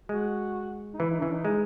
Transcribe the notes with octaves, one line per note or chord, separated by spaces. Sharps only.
G#3 F#4
D#4
E3 E4
D#4
E3 C#4
D#4
G#3 D#4